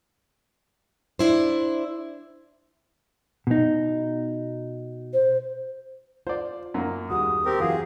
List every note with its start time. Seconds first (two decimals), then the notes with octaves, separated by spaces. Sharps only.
1.19 D4 E4 C5
3.47 B2 D#4
5.13 C5
6.27 F4 C5 D5
6.74 F#2 A#3
7.10 D#2 G3 G#3 F#4 D#6
7.45 C4 G4 A#4
7.60 E3 F#3 F4 F#4 G#4 F5